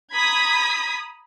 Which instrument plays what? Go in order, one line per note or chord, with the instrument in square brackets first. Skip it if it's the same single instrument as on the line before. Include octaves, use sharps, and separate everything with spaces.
[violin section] A#5 B5 D#6 G#6 B6